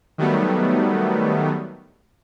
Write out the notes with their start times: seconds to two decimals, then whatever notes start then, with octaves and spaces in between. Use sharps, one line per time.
0.18 D#3 F#3 G3 A3 B3